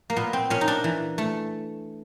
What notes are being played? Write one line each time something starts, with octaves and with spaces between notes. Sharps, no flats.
A#3
A#2 B3
C4
A#2 C#4
D#4
D4
E3
A3